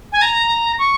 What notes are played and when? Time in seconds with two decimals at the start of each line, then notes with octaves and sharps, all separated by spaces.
0.12 G#5
0.22 A#5
0.79 C#6